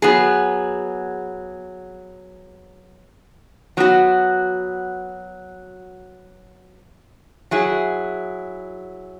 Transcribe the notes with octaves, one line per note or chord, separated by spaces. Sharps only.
F#3 B3 G#4
F#3 B3 F#4
F#3 E4 G#4